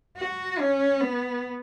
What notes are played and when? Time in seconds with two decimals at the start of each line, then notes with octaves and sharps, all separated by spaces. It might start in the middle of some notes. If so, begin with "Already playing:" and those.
0.18 F#4
0.60 C#4
1.00 B3